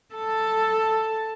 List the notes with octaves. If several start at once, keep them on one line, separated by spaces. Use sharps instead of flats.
A4 A5